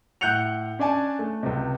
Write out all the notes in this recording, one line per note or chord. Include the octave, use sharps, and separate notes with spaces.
A2 F#5 F#6 G6 C#7 F7
C#4 D4 D5 G#5 A5
A3
C#2 C3